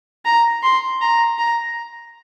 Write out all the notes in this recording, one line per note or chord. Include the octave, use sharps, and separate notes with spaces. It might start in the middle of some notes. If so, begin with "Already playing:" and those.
A#5
C6
A#5
A#5